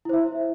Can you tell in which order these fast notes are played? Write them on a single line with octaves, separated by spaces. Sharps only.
E4 C5 E5